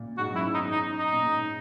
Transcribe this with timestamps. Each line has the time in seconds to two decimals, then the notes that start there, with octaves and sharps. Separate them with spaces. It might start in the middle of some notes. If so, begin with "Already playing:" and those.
Already playing: A#2
0.17 G#2 F#4
0.31 F#2
0.36 E4
0.44 G#2
0.54 D#4
0.58 E2
0.71 F#2 D#4
0.98 D#4
1.13 A#2
1.24 G#2